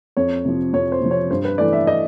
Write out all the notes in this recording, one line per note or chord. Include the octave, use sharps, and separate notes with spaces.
F2 C#5
C3 F3
F2 C#5
C5
C3 F3
C#5
G2 C5
B4
E3 A3 D5
E5
D#5